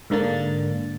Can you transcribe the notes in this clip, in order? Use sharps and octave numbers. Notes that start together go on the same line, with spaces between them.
G#2 D3 A#3 D4 A6